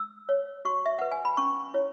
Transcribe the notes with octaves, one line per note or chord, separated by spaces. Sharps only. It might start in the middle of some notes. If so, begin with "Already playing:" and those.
Already playing: E6
C#5
F#4 C#6
E5
B4 F#5
G#5
B5
C#4 C#6
E4 C#5